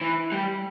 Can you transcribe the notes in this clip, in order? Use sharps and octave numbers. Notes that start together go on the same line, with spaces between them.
E3
G3